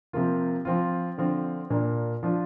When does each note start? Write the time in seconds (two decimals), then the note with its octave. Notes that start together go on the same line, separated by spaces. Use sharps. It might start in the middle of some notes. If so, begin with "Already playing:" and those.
0.13 C3 F3 A#3 F4
0.65 F3 C4 F4
1.18 D3 F3 C4
1.70 A#2 A#3 D4
2.23 F3 D4 F4